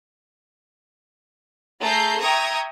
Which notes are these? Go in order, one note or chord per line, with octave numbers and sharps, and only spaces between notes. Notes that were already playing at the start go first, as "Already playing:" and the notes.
A3 G#4 A#5 G6 C7
E5 G5 A#5 C#6 D#6 G#6